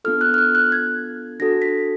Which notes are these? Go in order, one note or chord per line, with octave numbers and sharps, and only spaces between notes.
B3 D4 F4 A4 F6
F#6
F6
F#6
F#6
G#6
D4 F#4 A4 A#6
B6